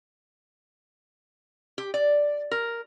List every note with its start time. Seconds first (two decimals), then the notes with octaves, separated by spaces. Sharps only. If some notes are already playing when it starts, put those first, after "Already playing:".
1.78 G4
1.94 D5
2.51 A#4